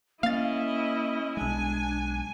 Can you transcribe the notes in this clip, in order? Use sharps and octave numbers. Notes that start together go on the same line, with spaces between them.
A#3 C#4 E4 D#5 F5 A6
B1 G#3 D4 G#5